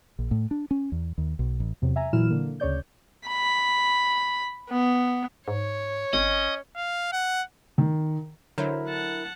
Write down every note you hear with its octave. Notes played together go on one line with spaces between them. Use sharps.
A#1
A2
D4
C#4
E2
D#2
B1
A1
E2 C3 F#3
E5 G#5 A#5
A#2 E3 F#3 E4 F6 E7
D3 A#3
D2 C#3 C#5 D5 G6
B5
B3
G#2 C#5
G#1 C#4 D#5
F5
F#5
D#3
D3 F#3 E4 A#4 C5
F#5 A5